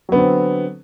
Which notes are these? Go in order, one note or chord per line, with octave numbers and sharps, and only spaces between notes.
D3 F#3 B3 C4